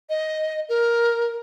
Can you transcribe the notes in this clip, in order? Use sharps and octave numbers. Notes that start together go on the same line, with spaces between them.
D#5
A#4